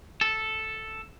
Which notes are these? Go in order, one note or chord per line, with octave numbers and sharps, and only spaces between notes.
A4